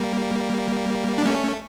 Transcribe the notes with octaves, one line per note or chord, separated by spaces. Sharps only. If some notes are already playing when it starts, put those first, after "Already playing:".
Already playing: G3 A#3
D4
A3 C#4